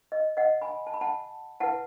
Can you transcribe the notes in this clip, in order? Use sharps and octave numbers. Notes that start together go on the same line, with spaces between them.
D#5
D#5 F#5
G#5 B5
A5
B5
F#5 A5
E4 B4 F#5 A5